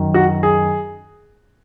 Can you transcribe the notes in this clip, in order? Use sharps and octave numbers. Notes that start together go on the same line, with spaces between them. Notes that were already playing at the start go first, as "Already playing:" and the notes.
Already playing: F#2 D#3 F#3
F#4
G#4